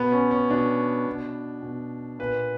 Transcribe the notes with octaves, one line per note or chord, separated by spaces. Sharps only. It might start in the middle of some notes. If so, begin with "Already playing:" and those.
Already playing: B2 B3
C#4
C#4
B2 D4
B2
B2
A#2 B4